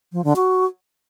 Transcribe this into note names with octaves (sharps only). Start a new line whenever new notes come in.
F3
D3
F#4